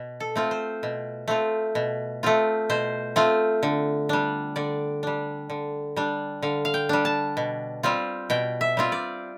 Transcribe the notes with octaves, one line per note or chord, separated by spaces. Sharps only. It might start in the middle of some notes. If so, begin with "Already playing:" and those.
Already playing: B2
A4
A3 C4 F4
C5
B2
A3 C4 F4
B2
A3 C4 F4
B2 C5
A3 C4 F4
D3
G3 D4
D3 D5
G3 D4
D3
G3 D4
D3 F5
F5
G5
G3 D4
A5
B2
G3 C4 F4
B2 G5
E5
G3 C4 F4
D5